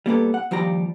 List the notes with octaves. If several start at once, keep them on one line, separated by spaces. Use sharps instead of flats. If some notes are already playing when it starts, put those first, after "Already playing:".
G3 A#3 B3 A4
F#5
D#2 F3 G3 G4 A#5